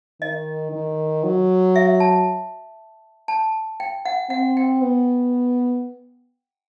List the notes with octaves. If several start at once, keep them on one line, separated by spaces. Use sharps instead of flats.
D#3 D#5
D#3
F#3
E5
A5
A5
G5
F#5
C4 F#5
G5
B3